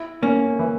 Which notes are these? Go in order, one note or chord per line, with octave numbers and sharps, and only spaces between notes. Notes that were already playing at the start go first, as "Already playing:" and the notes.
Already playing: E4
A#3 C#4
E3